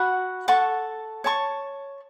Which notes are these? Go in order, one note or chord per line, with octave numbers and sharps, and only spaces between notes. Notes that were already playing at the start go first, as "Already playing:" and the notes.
Already playing: F#4 F#5 B5
A4 F#5 A5 C#6
C#5 A5 C#6